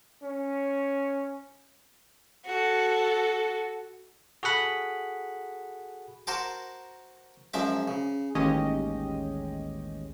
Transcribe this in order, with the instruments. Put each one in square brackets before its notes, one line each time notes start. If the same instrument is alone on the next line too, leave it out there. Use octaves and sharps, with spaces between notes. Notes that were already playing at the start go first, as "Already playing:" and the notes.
[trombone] C#4
[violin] F#4 A4
[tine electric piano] F#4 G#4 A4 F#5 B5
[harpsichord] F#4 A#4 C5 A5 C6 D6
F#2 F3 G#3 E5 D6
C#3
[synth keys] A1 D#2 G#3 C#4 G4 D#5